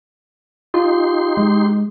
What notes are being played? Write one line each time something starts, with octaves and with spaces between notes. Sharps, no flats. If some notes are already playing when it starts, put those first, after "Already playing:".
D#4 F4 G4 C6
G#3